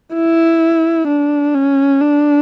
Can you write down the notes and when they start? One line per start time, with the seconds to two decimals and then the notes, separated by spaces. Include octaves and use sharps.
0.15 E4
1.08 D4
1.55 C#4
2.01 D4